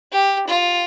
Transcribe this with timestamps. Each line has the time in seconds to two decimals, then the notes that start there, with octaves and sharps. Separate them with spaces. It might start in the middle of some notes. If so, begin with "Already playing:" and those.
0.12 G4
0.47 F4